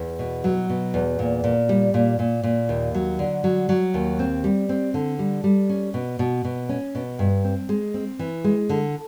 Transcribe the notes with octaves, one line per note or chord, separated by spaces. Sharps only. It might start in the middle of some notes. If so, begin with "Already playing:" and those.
Already playing: E2
B2
F#3
B2
E2
A#2
A#2
G3
A#2
A#2
A#2
D#2
F#3
D3
F#3
F#3
D#2
C4
G3
C4
D3
G3
G3
C#4
B2
B2
B2
C#4
B2
G2
C4
G#3
C4
E3
G#3
D3